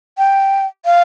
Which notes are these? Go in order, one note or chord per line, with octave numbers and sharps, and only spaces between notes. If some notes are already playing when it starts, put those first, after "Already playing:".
G5
F5